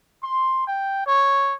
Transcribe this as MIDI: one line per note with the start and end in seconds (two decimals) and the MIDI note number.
0.23 0.64 84
0.68 1.06 79
1.06 1.54 73